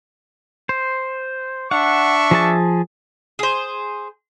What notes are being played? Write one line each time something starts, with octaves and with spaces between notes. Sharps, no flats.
C5
D4 E5 F#5 C#6
F3 G#4 A5
G#4 C5